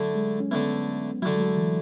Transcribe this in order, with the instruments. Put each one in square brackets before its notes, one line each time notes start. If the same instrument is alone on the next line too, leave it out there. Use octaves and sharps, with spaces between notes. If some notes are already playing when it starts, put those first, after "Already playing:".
Already playing: [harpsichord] D3 A3 E4 [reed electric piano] F#3
[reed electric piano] G#3
C#4
[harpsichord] D3 A3 E4 [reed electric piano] B3
[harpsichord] D3 A3 E4 [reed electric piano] F#3
[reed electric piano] G#3
F#3
E3